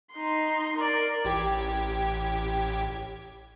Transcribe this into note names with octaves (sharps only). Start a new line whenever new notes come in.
D#4 C6
A#4 D5
A1 G4 G#6